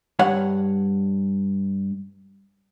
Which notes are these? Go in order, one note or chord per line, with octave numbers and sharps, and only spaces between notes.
G2 C#5 F#5